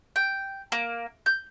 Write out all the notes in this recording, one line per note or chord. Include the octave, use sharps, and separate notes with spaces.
G5
A#3
G6